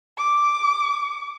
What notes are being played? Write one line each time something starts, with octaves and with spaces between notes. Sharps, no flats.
D6